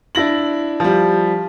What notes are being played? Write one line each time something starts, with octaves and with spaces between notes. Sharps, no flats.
D4 E4 A#6 F#7
F3 G3